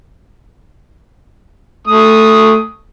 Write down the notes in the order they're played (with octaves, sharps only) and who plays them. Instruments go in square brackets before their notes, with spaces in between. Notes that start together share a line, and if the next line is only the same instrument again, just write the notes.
[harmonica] A3 D#6